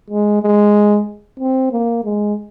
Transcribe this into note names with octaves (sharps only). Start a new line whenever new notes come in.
G#3
G#3
C4
A#3
G#3